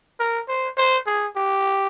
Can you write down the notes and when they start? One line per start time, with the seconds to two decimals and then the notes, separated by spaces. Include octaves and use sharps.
0.20 A#4
0.48 C5
0.77 C5
1.07 G#4
1.36 G4